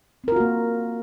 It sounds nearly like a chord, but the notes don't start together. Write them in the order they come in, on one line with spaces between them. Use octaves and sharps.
C4 A#4 F4 F#4 A#3